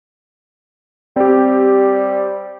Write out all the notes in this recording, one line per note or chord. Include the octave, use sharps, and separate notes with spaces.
G3 C4 G4